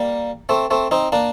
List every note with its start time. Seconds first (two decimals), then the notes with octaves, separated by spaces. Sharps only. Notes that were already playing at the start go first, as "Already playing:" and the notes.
Already playing: G3 A#3
0.49 A3 C4
0.71 A3 C4
0.91 C4 D#4
1.12 A#3 D4